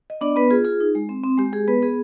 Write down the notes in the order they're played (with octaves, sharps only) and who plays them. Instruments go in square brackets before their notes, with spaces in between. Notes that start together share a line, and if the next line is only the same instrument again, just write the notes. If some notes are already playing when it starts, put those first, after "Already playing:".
[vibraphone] D#5
B3 D4 D5
B3 B4
F4 G#4
F4 G#4
D#4
G#3
C4
C4
G#3 G4
G#3 G#4
B3 B4
B3 G#4